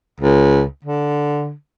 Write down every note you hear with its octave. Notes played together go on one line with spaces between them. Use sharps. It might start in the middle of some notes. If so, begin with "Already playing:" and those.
C#2
D3